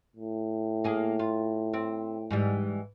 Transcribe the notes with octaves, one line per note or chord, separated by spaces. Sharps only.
A2
A#3 G#4
F4
C4
G#2 E3 G3